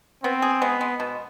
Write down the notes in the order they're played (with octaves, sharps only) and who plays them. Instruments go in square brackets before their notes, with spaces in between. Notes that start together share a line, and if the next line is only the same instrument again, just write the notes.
[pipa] B3 [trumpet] C4
[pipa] G#4
[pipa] G#3 [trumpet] B3
[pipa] G#3
B2